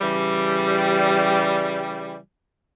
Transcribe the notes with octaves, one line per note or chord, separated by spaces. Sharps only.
C#3 E3 G3